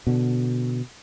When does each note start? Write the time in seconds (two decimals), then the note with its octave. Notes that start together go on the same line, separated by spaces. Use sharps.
0.07 B2 D3